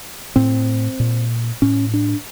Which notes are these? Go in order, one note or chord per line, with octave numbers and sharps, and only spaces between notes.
A2 C4
A#2
A2 C#4
D4